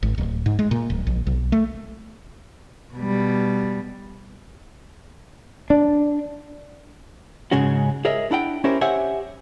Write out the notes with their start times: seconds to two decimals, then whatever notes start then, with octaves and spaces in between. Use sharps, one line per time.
0.03 G#1
0.18 D1
0.46 G#2
0.59 G#3
0.71 A#2
0.90 D1
1.07 A#1
1.27 B1
1.52 A3
2.94 B2 G3
5.70 D4
7.51 G#2 C#3 G#3 C#4 F#4
8.05 G#4 A#4 C#5 D#5 E5
8.31 D4 E4 F#5 G5
8.64 C#4 E4 G4 A#4 C5 C#5
8.81 G4 C5 C#5 E5 F#5 G#5